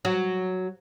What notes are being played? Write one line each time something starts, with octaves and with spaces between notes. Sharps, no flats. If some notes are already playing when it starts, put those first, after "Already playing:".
F#3